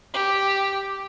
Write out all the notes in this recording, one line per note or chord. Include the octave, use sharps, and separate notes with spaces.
G4